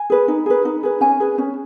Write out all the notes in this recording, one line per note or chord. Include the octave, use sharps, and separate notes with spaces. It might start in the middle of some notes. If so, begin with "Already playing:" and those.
Already playing: G#5
G#4 B4
D#4
G#4 B4
D#4
G#4 B4
C#4 G#5
G#4 B4
C#4